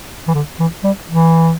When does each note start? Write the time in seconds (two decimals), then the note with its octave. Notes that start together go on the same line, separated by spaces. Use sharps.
0.28 E3
0.34 D3
0.59 E3
0.84 G3
1.09 E3